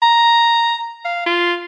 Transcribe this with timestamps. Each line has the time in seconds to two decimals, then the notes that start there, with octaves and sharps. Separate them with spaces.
0.02 A#5
1.05 F5
1.26 F4